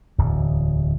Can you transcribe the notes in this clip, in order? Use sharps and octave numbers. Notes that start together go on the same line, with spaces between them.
D1 E2